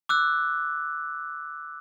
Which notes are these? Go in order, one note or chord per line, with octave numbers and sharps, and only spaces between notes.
D6 E6 F#6